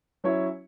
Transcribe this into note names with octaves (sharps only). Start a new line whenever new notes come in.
F#3 C#4 E4 C#5